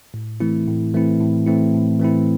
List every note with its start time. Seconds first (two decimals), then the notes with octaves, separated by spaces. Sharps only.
0.14 A2
0.40 E3 A3 C4 E4
0.67 A2
0.94 E3 A3 C4 E4
1.20 A2
1.47 E3 A3 C4 E4
1.74 A2
2.00 E3 A3 C4 E4